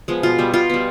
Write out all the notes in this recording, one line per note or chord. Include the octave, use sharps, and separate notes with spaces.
F3 G#3 B3
B2 F4
G3 B3
B2 F4
G3 B3